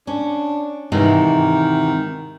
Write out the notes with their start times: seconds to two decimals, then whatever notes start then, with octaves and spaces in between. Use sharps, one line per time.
0.07 C#4 D4
0.92 G#2 C3 D#3 E3